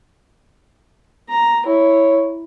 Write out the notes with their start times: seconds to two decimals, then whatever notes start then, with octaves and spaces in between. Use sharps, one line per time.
1.29 A#5
1.66 E4 C#5